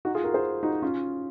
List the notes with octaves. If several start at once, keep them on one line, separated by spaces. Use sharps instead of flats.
D#4 F#4
F4 G#4
F#4 A#4
G#4 C5
D#4 F#4
C#4 F4